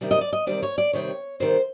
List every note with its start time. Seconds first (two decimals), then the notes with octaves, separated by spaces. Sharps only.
0.01 C3 D#3 G3 C4
0.11 D#5
0.21 D5
0.33 D#5
0.47 C3 D#3 G3 C4 D5
0.63 C#5
0.78 D5
0.93 C3 D#3 G3 C4 C#5
1.40 C3 D#3 G3 C4 C5